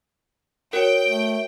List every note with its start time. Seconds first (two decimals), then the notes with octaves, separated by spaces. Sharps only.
0.73 F#4 A#4 C#5 G5
1.06 A3